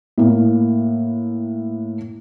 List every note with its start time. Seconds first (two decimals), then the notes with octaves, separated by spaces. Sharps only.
0.18 A2 A#3